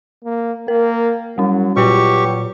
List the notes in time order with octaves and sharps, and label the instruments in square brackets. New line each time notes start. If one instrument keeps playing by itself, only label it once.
[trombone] A#3
[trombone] A#3 [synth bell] A#4
[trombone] F#3 [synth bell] G3 C#4
[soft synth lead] A#2 [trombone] F#3 [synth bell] F#4 B4 [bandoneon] G4 C#6